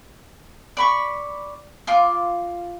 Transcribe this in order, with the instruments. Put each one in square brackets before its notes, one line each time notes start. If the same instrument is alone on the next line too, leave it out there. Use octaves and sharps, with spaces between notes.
[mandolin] D5 B5 C#6
F4 C6 D6